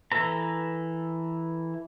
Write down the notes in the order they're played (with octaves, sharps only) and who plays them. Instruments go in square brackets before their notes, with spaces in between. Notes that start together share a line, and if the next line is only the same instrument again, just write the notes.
[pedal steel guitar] E3 A4 B4 A#5